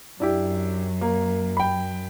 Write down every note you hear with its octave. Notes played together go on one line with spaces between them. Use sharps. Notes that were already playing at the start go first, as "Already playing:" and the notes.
F#2 D4 E4 G4
A#3
G5 B5